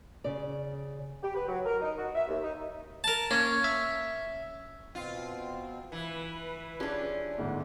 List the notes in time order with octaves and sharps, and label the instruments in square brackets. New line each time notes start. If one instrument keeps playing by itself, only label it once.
[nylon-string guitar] C#3 D5
[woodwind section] G4
B4
F#3
A#4
D#4
F#4
E5
D#2
D#4
[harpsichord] A#4 A5
[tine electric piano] A#3 C#5 [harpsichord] C#4
[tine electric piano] E5
[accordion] B2 C4 [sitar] F4
[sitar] E3 [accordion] B4
[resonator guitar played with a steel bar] C#4 D4 [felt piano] F4 G4 G#4
[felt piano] G1 D2 G#2